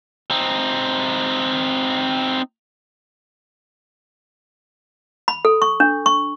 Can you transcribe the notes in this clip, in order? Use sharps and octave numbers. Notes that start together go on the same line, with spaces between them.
C4 D#4
B5
A4
C#6
D4
C#6